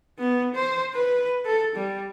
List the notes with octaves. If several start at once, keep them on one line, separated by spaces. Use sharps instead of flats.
B3
C5
B4
A4
G3